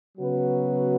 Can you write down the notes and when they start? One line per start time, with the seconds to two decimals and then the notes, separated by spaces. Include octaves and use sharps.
0.18 C#3 F#3 B3 F#4 B4